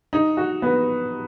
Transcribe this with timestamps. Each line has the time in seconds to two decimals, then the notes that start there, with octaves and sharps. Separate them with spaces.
0.13 D#4
0.37 F#4
0.62 B3